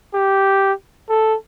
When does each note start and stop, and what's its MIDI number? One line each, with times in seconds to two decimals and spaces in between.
0.15 0.72 67
1.09 1.35 69